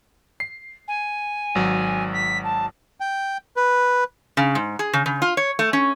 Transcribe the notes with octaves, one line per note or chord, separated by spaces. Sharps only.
C7
G#5
G#1 F#3
B6
A5
G5
B4
C#3
G#2
G#4
C#3
C#3
F4
C#5
A3
C#4